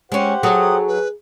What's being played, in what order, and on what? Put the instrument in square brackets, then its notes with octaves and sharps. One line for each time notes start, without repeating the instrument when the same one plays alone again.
[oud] G#3 C#4 [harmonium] G4 C5 F#5
[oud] F#3 F#4 A4 [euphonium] G#4 [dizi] D#6
[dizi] B4